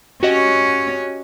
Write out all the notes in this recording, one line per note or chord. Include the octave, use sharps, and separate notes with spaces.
C#4 F#4 G4 C#5 D#5